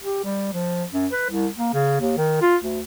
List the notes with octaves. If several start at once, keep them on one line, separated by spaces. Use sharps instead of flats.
G4
G3
F3
F#2
B4
C2
A#3
C#3
D#2
D#3
F4
D2